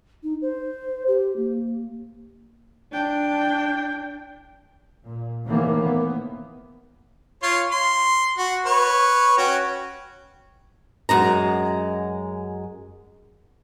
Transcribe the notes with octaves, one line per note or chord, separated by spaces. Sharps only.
D#4
C5
G4
A#3
D4 G5
A#2
A2 C3 D#3 E3 A#3 B3
B3
F4 C#5 C6
C6
F#4
B4 C#5
C#4 F#4 G5
F#2 G#3 A#5